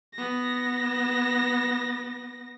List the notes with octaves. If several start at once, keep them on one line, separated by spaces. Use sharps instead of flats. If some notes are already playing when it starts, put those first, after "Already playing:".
B3 A#6